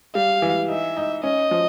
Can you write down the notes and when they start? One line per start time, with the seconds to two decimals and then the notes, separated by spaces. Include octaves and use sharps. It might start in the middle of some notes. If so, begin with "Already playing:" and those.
0.15 G3 F5
0.42 E3
0.69 D#4 E5
0.97 D#4
1.23 C#4 D#5
1.51 F3